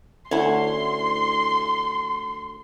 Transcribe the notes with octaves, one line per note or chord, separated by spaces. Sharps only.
D2 C#4 E4 C6